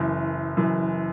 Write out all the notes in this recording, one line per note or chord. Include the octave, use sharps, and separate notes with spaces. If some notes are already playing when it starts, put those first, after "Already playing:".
Already playing: F#1 F#2 E3
F#1 F#2 E3